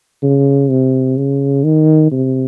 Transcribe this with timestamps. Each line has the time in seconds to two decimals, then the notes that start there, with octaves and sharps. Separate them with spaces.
0.23 C#3
0.70 C3
1.17 C#3
1.64 D#3
2.12 C3